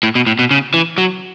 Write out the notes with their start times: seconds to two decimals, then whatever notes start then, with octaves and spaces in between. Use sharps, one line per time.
0.03 A2
0.15 B2
0.27 A2
0.39 B2
0.51 C#3
0.74 E3
0.98 F#3